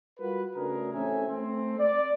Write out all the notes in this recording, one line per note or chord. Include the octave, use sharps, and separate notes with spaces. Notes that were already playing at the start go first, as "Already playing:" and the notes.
G3 F4 F#4 A#4 B4
C#3 A3 D4 F#4 G#4 A#4
A1 A3 C4 C#4 E5 G#5
A3 C4
D5